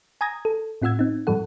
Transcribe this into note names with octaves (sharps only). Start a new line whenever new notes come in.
G#5 A#5 D#6 G#6 A#6
A4
A2 C4 F4 F#5 E6 G#6
C4 D#4
G#2 F3 G3 A4 F#5